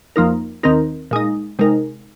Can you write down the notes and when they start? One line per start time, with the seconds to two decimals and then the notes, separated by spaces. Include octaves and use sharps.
0.16 F2 F3 A#3 D#4 A#4
0.63 D#2 D#3 C4 D#4 A#4
1.11 A#2 G#3 D#4
1.59 C3 G#3 D#4 A#4